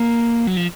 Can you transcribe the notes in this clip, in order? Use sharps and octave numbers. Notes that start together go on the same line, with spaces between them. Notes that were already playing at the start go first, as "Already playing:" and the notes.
Already playing: A#3
F#3
F3